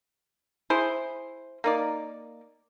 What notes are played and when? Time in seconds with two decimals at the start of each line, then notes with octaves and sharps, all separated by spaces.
0.70 E4 G#4 C5
1.64 A#3 D#4 D5